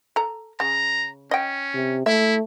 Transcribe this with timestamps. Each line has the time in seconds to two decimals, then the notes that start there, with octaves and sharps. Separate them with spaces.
0.16 A4 A#5
0.60 C#3 A#5
1.31 C#4 D#5 G5
1.74 C3
2.06 A3 E4 E5